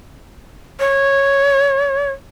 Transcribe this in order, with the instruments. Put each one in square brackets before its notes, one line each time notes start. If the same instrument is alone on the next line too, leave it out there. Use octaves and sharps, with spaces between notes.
[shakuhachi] C#5